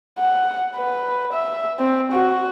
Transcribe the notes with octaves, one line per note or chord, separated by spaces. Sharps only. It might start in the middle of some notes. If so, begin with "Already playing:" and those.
F#5
B4
E5
C4
F#4